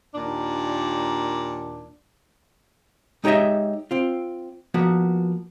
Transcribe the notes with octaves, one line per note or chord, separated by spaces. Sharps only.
D#2 A#2 D4
G#3 D#4 G4 C#5 D#5 E5
C4 F4
F3 A#3 B3 F#4